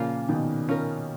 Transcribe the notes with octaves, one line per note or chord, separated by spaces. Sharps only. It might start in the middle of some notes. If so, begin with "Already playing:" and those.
Already playing: A#2 C#3 F3 A#3 F4
B2 D#3
C#4 F4 A#4